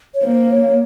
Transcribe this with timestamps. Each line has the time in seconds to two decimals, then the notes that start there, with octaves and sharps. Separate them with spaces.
0.14 C#5
0.23 A#3 C5
0.50 C#5